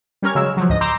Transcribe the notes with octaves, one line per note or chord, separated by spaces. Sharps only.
G3 C#4 A#4 F6 G#6
C#3 F#3 G#3 E6 E7
F3 F#3
D2 G#2 D#5 A#6
A#5 C6 D6 E6 G6 A#6